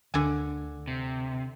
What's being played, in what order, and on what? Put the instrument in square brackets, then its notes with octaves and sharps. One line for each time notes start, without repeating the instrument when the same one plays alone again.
[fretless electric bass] D2 [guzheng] D3 G#5
[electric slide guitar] C3